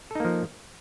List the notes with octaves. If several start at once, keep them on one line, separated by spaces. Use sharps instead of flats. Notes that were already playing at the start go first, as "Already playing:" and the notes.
F3 A#3 D#4 A4